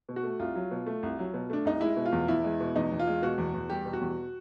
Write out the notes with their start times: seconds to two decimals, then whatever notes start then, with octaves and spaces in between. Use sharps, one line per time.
0.09 B2
0.16 F#4
0.23 A3
0.39 C2 F4
0.56 F#3
0.71 B2
0.86 A3
1.03 C2
1.19 F#3
1.34 B2
1.50 A3 D4
1.65 C2 D#4
1.81 G#3 E4
1.97 B2
2.05 F4
2.12 E2
2.28 E2 E4
2.44 G#3
2.60 B2
2.76 E2 D#4
2.92 E2
2.99 F4
3.07 G#3
3.22 B2 F#4
3.38 E2
3.54 E2
3.70 G3 G4
3.85 B2
3.93 F#4
4.01 E2